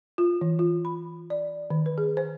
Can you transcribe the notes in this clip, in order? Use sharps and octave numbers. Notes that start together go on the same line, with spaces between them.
F4
E3
F4
B5
D5
D#3
B4
G#4
C5